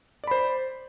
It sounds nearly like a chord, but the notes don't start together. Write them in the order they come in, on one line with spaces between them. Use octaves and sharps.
D5 B5 C5